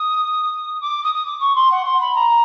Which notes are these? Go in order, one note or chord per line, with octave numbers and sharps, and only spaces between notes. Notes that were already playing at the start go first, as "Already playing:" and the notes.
Already playing: D#6
D6
D#6
D#6
D6
C#6
C6
F#5
C6
B5
A#5